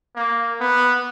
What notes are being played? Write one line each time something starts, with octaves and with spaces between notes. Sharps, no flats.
A#3
B3